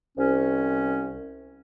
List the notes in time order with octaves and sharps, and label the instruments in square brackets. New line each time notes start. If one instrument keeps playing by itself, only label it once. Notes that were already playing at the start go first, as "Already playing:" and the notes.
[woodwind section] C2 C#4